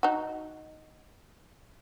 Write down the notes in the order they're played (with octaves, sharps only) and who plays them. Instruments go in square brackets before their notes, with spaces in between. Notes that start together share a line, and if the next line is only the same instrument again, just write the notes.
[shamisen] D#4 F#4